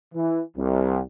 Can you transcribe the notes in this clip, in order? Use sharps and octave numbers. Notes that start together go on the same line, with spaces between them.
E3
C2